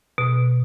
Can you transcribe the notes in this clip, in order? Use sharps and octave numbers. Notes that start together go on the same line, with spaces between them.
B2